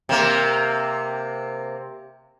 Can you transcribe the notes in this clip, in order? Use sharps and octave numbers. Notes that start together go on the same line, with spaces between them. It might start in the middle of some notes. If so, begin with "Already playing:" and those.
C3 A#3